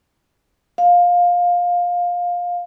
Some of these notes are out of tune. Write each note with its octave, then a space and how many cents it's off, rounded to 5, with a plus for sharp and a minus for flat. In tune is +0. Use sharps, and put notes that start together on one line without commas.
F5 +15